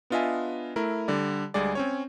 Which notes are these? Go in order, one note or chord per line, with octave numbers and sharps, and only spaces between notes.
B3 D4 F4 D#5 E5 G#5
A3 E4 A#4
D3 G3 D5
D2 G3 G#3 G#4 D5
C4 C#4 C#5